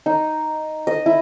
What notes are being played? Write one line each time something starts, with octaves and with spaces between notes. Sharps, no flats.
D#4
D#5
E4